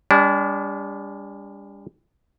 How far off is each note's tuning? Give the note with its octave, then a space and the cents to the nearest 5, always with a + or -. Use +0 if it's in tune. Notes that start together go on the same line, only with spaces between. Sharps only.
G3 +40 D4 -35